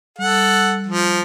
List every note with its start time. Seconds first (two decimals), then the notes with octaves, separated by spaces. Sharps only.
0.19 G3 A4 F#5
0.87 F3